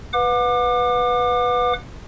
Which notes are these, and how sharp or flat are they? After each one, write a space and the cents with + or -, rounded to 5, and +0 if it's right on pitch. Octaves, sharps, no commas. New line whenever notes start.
B4 +0 F#5 -40 D6 +30